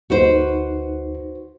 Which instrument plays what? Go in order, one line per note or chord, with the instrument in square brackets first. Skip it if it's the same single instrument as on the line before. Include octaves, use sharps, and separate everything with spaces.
[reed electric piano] D2 D#4 [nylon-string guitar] F#4 B4 C5